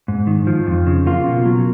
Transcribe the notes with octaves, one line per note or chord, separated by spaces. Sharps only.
G#2
D#3
F3
F2
C#3
A#3 F4
B2
F#3